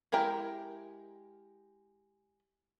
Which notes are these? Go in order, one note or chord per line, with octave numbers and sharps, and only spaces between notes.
G#3 E4 G4 A#4 G5